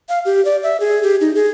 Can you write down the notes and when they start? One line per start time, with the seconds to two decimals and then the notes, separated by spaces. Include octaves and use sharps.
0.09 F5
0.25 G4
0.45 D5
0.63 E5
0.80 G#4
1.03 G4
1.21 D#4
1.35 G#4